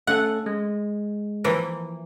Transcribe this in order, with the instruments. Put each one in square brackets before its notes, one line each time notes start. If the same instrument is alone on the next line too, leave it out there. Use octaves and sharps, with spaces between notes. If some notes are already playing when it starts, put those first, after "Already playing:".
[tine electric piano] A3 C#4 A4 [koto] F#5
[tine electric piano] G#3
[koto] E3 F3 A#3